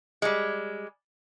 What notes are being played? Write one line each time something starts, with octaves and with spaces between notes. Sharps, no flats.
G3 G#3